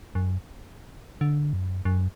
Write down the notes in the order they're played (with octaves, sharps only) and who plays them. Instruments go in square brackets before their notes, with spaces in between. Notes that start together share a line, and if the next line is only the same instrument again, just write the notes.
[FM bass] F#2
D3
F#2
F#2